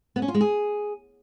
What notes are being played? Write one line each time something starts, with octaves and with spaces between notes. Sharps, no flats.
B3
C#4
F4
G#3
G#4